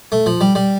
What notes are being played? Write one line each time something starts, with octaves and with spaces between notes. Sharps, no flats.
A3
F3
G3
G3